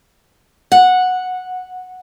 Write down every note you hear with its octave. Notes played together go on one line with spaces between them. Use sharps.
F#5